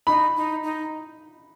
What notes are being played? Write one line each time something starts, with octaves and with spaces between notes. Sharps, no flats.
D#4 B5
D#4
D#4